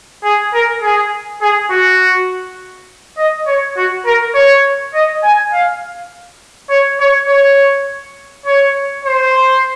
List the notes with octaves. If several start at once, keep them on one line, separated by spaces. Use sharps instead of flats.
G#4
A#4
G#4
G#4
F#4
D#5
C#5
F#4
A#4
C#5
D#5
G#5
F5
C#5
C#5
C#5
C#5
C5